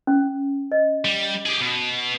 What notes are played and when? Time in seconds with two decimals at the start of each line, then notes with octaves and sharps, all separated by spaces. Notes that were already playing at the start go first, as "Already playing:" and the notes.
0.07 C#4
0.72 D#5
1.05 G3
1.46 G4 G#4
1.61 B2